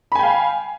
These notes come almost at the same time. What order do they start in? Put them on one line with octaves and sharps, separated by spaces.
B5 G#5 G5 F5